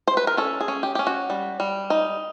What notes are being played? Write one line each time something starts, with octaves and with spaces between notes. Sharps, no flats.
C5
B4
A#4
C#4 A4
G#4
C#4
G4
C#4 G4
F#4
G3
G3
D#4